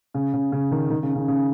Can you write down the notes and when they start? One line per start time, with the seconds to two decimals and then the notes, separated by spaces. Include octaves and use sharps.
0.14 C#3
0.34 C#3
0.52 C#3
0.71 D#3
0.90 D#3
1.03 C#3
1.15 C#3
1.28 C#3